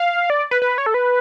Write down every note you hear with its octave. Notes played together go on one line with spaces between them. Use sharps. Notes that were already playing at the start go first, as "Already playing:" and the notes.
Already playing: F5
D5
B4
B4
C#5
A4
B4